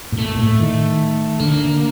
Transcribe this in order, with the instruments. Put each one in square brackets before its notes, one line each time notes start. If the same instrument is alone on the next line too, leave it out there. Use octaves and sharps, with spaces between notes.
[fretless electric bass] A2
[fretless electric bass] A#2 [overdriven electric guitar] A3
[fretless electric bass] A2
D#3
[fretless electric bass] D3 [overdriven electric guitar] A#3